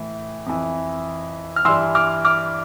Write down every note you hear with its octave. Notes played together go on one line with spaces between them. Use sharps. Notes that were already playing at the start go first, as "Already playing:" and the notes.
Already playing: A2 E3
F2 E3
F6
G2 E3 C6 E6
D6 F6
D6 F6